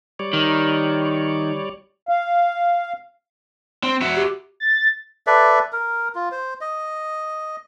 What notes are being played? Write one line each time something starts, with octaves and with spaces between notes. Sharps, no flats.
G3 C#5 D5
D#3
F5
C4
F#4 E5
G4
A6
A4 B4 D5 E5
A#4
F4
C5
D#5